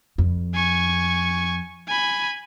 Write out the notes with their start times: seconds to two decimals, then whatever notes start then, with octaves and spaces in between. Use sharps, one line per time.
0.18 F2
0.55 G#5 C#6
1.88 G#5 B5